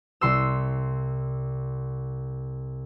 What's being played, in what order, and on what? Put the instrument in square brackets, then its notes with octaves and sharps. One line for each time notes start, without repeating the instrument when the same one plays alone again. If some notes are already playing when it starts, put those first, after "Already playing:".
[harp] C2 C6 E6